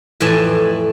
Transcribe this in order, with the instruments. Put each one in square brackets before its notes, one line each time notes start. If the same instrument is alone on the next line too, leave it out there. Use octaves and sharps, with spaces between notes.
[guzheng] F2 A2 E3 D5 G#5 A5